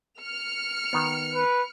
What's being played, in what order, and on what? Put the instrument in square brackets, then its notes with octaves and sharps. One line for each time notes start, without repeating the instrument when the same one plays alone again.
[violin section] F6 C#7
[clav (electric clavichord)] D#3 B3
[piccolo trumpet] B4